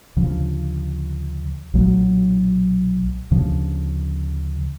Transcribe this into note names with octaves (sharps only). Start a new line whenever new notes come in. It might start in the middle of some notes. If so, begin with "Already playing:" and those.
D2 C#3 F3
B1 A#2 F#3 A3
D2 C#3 F3